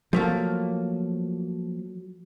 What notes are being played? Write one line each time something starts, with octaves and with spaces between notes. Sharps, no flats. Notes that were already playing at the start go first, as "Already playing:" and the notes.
F3 F#3 A3 A#3